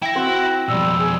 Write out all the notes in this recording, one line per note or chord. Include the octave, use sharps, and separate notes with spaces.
E4 G5 A#6
C4 F#4
F2 B2 G3 E6
G#4